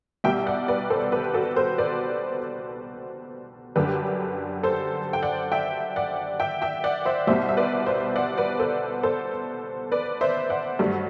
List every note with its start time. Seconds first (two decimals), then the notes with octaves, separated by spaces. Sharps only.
0.24 C2 B2 G3 E5 G5
0.46 D5 F#5
0.68 B4 D5
0.90 A4 C5
1.12 G4 B4
1.34 F#4 A4
1.56 A4 C5
1.78 B4 D5
3.76 F#2 D3 G3 G4 B4
4.63 A4 C5
5.13 G5
5.22 D5 F#5
5.52 E5 G5
5.96 D5 F#5
6.40 E5 G5
6.62 E5 G5
6.84 D5 F#5
7.05 C5 E5
7.27 C2 B2 G3 C5 E5
7.49 E5
7.57 B4 D5
7.86 C5 E5
8.16 D5 F#5
8.37 B4 D5
8.59 A4 C5
9.03 A4 C5
9.92 B4 D5
10.21 C5 E5
10.50 D5 F#5
10.79 G2 F#3 A3